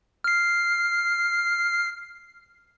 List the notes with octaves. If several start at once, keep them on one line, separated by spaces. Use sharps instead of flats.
F6 C7